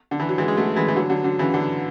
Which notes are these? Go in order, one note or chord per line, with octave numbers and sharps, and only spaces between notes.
D3
E3
F#3
E3 G#3
G#3
F#3 A3
E3 G#3
E3
D3 F#3
D3 F#3
D3 F#3
C#3 E3
D3 F#3